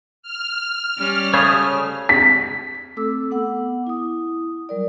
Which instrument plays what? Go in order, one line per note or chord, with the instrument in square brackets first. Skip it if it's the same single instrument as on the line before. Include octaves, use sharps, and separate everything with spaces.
[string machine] F6
[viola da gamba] G3 C#4
[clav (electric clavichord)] C#3 A3 C5 [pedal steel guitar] C#5 D#6
[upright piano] B6
[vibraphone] A3 C4 A4 D6 E6
B3 F#5 D6
E4 D#6
F#3 G3 A#4 D5